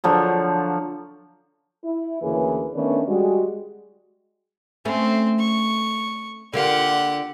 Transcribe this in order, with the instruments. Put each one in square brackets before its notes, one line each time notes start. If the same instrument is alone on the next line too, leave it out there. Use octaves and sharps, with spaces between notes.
[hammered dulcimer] D3 F3 F#3
[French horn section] E4
D2 C#3 E3 A#3 G#4 B4
D#3 A3 B3 C#4 D4
G3 G#3 F#4
[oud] A3 C#4 [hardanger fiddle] C4
[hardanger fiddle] C#6
[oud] D3 A#3 F4 [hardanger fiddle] G4 F#5